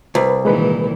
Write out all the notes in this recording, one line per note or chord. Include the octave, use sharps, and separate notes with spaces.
C2 B4
A#2 D#3 E3 G#3 B4